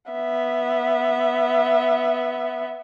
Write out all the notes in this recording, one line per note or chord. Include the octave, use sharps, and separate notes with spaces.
B3 E5